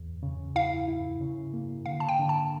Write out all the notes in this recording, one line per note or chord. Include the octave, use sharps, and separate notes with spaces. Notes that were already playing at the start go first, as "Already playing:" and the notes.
Already playing: E2
C#3
E4 F5
E4
C#3
A#3
D3 F5
A5
G5
D3
A5